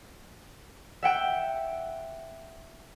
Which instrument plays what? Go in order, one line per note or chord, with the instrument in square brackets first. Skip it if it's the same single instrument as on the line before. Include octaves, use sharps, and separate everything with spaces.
[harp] E5 F#5 G5 G6